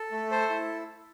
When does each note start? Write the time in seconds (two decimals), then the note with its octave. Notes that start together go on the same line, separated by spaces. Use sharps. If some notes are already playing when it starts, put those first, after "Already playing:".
Already playing: A4
0.11 A3
0.31 A4 C5
0.50 E4